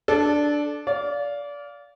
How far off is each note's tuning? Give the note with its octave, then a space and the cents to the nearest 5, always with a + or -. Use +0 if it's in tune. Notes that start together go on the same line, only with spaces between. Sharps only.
D4 +0 A4 -20
D5 -25 F5 +5